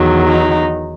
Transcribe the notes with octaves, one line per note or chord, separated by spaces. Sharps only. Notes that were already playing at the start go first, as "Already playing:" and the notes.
Already playing: E2 D#3 F#3
D#4